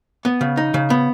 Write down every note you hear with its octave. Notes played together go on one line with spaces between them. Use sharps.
B3
C#3
D#4
C#3
B3